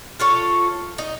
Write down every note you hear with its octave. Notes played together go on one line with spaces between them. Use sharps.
F4 A4 C#5
D#4